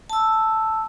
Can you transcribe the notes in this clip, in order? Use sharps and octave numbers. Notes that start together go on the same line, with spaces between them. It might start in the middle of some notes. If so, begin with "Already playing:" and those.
A5 E6